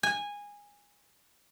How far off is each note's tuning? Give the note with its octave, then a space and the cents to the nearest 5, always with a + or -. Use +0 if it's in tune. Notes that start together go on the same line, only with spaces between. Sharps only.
G#5 -15